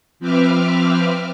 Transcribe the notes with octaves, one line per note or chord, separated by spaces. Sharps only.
F3 C4 B4 E5 D6 F6